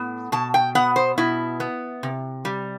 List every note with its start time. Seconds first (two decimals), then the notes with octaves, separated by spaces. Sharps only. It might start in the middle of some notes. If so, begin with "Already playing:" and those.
Already playing: A2 B3
0.32 B2 A5
0.54 G5
0.75 B3 F#5
0.96 C5
1.18 B2 E4
1.60 B3
2.03 C3
2.45 G3